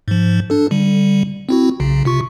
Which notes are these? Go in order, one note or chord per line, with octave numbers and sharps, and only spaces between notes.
G#2 F3
D4 A4
D3 G3
C4 E4 F#4
B1 C#3
C3 F4 C#6